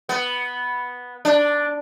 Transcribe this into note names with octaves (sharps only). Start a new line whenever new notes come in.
B3
D4